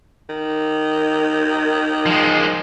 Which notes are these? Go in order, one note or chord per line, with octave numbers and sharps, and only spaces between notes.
D#3
F3 G#3